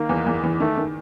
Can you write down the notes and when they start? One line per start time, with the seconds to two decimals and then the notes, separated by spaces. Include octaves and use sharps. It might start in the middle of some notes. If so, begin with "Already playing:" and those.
Already playing: D#3 A#3
0.09 E2 E3
0.26 E2 E3
0.43 E2 E3
0.60 D#3 A3
0.77 D#3